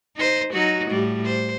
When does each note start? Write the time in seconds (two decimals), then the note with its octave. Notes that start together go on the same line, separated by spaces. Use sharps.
0.16 D#4 C5
0.53 F#3 D#4 F#4
0.89 A2 G3
1.25 C5